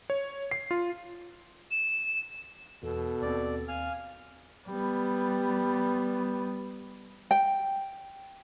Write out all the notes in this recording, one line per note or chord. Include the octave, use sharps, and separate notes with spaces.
C#5
C7
F4
E7
E2 B2 A4
D#2 C4 D5
F5 G#5 F6
G3 B3
G5